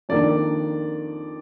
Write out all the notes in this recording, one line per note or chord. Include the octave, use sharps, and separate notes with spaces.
F2 D#3 A#3 D4 D5